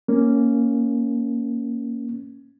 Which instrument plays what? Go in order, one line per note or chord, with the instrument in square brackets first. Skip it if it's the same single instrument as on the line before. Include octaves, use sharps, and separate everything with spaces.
[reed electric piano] A#3 C#4